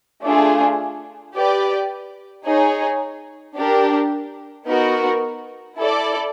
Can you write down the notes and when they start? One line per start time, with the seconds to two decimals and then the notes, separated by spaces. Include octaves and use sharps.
0.22 A3 D4 F4 G#4
1.34 G4 B4 D5
2.44 D#4 G#4 C#5
3.56 D4 G4 A#4
4.66 B3 D#4 F#4 A#4
5.77 E4 A4 D5